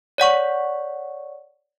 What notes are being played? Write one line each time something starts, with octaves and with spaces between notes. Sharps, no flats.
C#5 D5 F#5 C#6